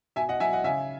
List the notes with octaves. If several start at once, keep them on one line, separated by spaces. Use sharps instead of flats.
B2 E5 G#5
D#5 F#5
F#3 E5 G#5
D#5 F#5
C#3 E5 G#5